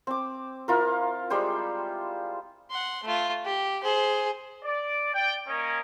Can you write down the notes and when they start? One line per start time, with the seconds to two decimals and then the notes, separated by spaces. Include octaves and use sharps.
0.07 C4 D6
0.68 E4 F4 A#4
1.30 G3 G#3 C5 G5
2.71 F#5 C6
3.04 A3 F4
3.45 G4
3.83 G#4 C5
4.64 D5
5.14 D5 G5
5.48 A#3 C#4 A#4 C#5 D#5